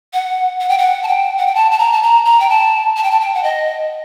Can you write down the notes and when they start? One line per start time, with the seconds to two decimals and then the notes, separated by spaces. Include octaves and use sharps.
0.13 F#5
0.61 F#5
0.69 G5
0.78 F#5
1.03 A5
1.08 G5
1.38 F#5
1.47 G5
1.55 A5
1.71 A5
1.79 A#5
1.93 A5
2.03 A#5
2.25 A#5
2.40 G5
2.50 A5
2.97 A5
3.03 G5
3.11 A5
3.20 G5
3.34 F#5
3.43 D#5